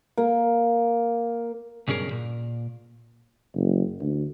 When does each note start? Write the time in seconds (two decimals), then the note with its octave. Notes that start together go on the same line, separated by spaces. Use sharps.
0.17 A#3
1.88 B1 G2 C#3 G#4 A#4
2.11 A#2
3.54 F#1
4.01 D2